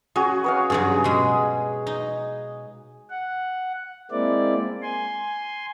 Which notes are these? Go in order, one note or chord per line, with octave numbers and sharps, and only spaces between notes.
C#4 F#4 G#4
B4 C#5 F5
G2 C#3 F#3 G#4
B2 G#3
D#4
F#5
G#3 A#3 C4 E4 D5
G#5 C6